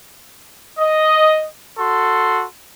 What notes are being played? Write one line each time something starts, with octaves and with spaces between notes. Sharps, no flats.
D#5
F#4 A4 C6